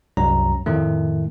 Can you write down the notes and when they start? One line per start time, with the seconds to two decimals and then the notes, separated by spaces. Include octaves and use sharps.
0.17 C2 F#2 F#3 A#5
0.66 F2 A2 D#3 A3